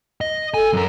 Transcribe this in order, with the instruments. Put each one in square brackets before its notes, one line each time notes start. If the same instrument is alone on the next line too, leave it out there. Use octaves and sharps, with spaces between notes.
[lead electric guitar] D#5
[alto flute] A4 [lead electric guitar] G#5
[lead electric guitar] F#2 A#4